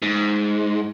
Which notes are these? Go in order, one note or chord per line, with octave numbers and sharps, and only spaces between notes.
G#2